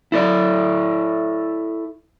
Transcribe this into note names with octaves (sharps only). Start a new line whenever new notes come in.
E4 A4 D5